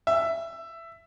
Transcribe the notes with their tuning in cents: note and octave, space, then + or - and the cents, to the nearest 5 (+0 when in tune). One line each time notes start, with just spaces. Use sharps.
E5 +15